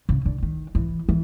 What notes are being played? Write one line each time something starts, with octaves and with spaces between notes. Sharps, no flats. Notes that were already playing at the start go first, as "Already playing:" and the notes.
C#3
D3
D#3
E3
E3